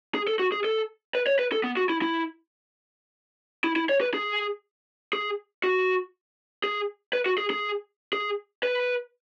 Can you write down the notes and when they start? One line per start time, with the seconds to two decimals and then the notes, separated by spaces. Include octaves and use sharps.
0.15 G#4
0.27 A4
0.39 F#4
0.52 G#4
0.64 A4
1.15 B4
1.27 C#5
1.39 B4
1.52 A4
1.64 B3
1.77 F#4
1.90 E4
2.02 E4
3.64 E4
3.76 E4
3.89 C#5
4.01 B4
4.14 G#4
5.13 G#4
5.64 F#4
6.64 G#4
7.13 B4
7.26 F#4
7.38 G#4
7.50 G#4
8.13 G#4
8.63 B4